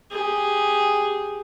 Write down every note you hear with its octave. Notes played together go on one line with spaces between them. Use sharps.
G4 G#4